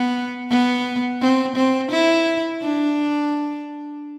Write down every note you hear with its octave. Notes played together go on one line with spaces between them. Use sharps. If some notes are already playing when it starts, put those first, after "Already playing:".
Already playing: B3
B3
C4
C4
E4
D4